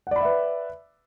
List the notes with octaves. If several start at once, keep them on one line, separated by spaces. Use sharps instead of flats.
B4 D5 E5 F#5 B5